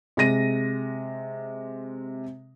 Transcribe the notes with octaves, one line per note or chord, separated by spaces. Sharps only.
C3 G#3 A#6 D#7